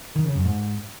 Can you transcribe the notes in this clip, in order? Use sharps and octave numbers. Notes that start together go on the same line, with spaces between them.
D#3
C#3
F#2
G#2